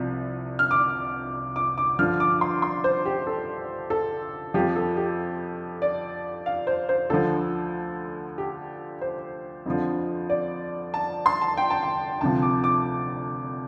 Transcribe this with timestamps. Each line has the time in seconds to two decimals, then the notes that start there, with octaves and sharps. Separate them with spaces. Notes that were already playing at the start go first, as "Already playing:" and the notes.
Already playing: C2 C3 F3
0.59 F6
0.71 D6
1.56 D6
1.78 D6
1.99 G2 D3 F3 F6
2.20 D6
2.41 C6
2.62 C6
2.84 C5
3.05 G4
3.27 A4
3.90 A4
4.54 F2 F3 G4
4.76 A4
4.97 G4
5.82 D5
6.46 F5
6.67 C5
6.89 C5
7.10 D2 D3 F3 A4
8.38 G4
9.01 C5
9.66 F2 D3 F3
10.30 D5
10.94 A5
11.26 C6
11.41 A5
11.57 G5
11.70 A5
11.83 G5
12.21 D2 C3 F3 A5
12.42 D6
12.64 D6